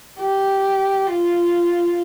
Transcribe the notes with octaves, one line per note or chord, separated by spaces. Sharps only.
G4
F4